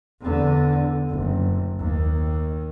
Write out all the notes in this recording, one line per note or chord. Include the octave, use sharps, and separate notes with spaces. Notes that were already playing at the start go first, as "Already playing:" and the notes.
E2 D3
F#1
D#2